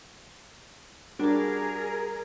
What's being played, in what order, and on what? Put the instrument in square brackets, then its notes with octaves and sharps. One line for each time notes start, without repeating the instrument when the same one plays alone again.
[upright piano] G3 F#4 [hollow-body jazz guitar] D4 D5 [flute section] G#4 A#4